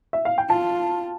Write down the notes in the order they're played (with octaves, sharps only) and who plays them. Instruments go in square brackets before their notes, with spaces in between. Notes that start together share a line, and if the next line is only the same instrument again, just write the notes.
[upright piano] E5
F5
G5
[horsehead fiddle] F4 [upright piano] A5